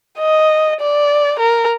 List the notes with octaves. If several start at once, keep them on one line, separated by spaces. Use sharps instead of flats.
D#5
D5
A#4